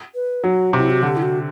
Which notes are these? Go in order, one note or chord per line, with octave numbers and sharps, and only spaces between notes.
B4
F#3 F#4
C3 E4
F#4
D3 G4
E4
F#4